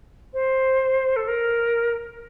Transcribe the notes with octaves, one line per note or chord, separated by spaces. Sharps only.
C5
A4
A#4